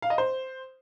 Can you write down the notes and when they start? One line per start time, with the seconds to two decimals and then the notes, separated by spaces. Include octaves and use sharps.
0.02 F5
0.10 D#5
0.18 C5